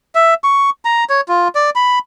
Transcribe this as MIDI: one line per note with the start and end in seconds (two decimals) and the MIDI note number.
0.15 0.34 76
0.44 0.70 85
0.85 1.04 82
1.10 1.21 73
1.28 1.48 65
1.55 1.70 74
1.75 1.99 83